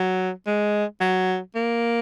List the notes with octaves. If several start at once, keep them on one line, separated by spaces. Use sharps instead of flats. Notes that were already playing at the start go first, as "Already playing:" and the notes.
Already playing: F#3
G#3
F#3
A#3